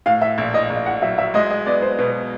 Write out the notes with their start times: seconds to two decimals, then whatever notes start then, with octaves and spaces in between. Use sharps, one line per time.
0.06 A2 F5
0.22 E5
0.38 A#1
0.54 D#5
0.70 A#1
0.86 F#5
1.02 F#3 E5
1.18 E5
1.34 G#3 D#5
1.50 D#5
1.66 B3 D5
1.82 C5
1.99 B2 B4